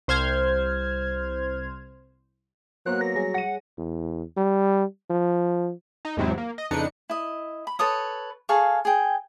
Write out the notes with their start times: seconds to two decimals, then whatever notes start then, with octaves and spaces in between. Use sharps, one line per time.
0.08 C2 C5 F6 G#6
2.86 F#3 A#3 B3 C5 F#6
3.01 A#4 A#6
3.14 G3 G#4 C#5
3.34 F#5 A#6 D#7
3.78 E2
4.37 G3
5.10 F3
6.05 D#4
6.17 E2 G#2 C3 F#3 C4 E4
6.38 A#3
6.58 D#5
6.71 F2 C#3 D4 D#4 B4 C#7
7.10 E4 D#5
7.67 B5
7.79 A4 B4 C#5 D#6
8.49 G#4 A4 F5 C#6
8.85 G#4 G5